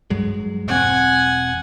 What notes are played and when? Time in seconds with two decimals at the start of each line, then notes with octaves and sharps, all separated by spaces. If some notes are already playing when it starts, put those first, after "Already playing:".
0.10 G2 F#3 G#3
0.68 E1 C4 F#5 G#5